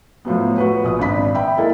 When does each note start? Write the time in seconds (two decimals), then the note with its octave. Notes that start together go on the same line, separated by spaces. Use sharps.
0.25 A2 F3 F#3 B3
0.58 F#4 B4
0.84 A#1 D#6
0.99 G#1 D4 B5 B6
1.34 E5 G5 B5
1.57 A#3 E4 A4 A#4 D#5